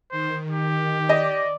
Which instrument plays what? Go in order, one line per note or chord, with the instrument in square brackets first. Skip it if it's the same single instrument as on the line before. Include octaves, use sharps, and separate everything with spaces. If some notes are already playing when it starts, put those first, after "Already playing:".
[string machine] D#3 [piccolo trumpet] C5
[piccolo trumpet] G4
[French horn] D5 [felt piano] D#5